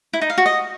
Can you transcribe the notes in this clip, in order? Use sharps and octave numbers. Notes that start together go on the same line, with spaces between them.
E4
D#4
F5
F#4
D#5